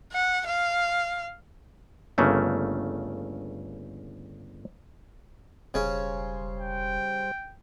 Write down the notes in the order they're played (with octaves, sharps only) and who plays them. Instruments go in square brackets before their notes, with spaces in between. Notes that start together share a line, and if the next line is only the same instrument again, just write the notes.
[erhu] F#5
F5
[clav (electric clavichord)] G1 C#3 A3 A#3
[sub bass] E1 [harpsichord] C#3 C#4 [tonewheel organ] G3 C5
[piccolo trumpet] G5